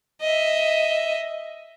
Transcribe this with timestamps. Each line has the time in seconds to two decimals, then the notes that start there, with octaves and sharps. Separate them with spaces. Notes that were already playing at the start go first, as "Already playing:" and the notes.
0.21 D#5 E5